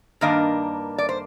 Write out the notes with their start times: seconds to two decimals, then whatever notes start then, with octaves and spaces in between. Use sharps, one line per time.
0.21 G2 D#3 A#3 D4 D#5
0.98 D5
1.09 C5